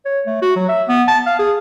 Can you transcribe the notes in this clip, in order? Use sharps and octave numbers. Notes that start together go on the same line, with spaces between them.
C#5
A3
F#4
F#3
E5
B3
A5
F5
G#4